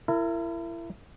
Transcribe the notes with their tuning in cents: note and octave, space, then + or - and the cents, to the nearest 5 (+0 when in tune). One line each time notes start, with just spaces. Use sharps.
E4 +30 A#4 -30